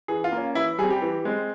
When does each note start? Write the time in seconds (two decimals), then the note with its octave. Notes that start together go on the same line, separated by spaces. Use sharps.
0.08 E3 G#4
0.24 F4
0.32 A#3 C#4
0.55 E3 E4
0.78 G3 G#4
0.83 C4
0.90 G4
1.02 E3
1.25 G#3 C4